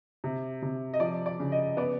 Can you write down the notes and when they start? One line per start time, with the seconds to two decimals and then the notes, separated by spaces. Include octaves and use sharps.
0.24 C3
0.62 C3
0.94 D#5
1.00 F3 D5
1.26 D5
1.40 C#3
1.52 D#5
1.77 B3 D5